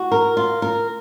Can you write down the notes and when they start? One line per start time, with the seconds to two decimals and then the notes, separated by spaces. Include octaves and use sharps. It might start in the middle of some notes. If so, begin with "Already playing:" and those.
Already playing: F#4
0.12 A#4
0.37 F4
0.62 A#4